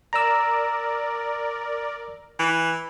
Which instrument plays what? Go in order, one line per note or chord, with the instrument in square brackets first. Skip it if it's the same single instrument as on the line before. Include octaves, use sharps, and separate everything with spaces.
[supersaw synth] A#4 D5 [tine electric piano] A#5 E6
[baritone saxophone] E3